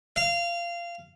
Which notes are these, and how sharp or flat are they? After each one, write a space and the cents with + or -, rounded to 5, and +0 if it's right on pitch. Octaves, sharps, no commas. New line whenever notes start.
F5 -20